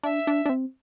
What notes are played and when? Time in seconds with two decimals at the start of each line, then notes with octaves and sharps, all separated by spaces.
0.03 D4 E5
0.27 D4
0.46 D4
0.49 C4